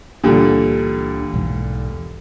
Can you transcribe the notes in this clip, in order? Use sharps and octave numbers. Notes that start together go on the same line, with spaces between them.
C#2 A#2 D3 E3 G3 D4
B1 E2 G#2